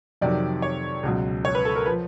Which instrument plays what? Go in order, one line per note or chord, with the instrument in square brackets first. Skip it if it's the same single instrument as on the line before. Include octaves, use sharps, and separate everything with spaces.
[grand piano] F2 C3 D#3 F#3 D5
C#5
C#2 B2 F#3
C#5
B4
A4
A#4
F3 B4